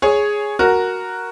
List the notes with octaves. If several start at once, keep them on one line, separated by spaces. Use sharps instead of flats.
G#4 C#5
F#4 A#4